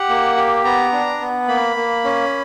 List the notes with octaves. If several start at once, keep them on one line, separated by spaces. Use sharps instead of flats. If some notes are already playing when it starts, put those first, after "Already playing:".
Already playing: G4 F#5
A#3
G4
B3 A#5
D4
B3
A#3 B5
A#3
C#4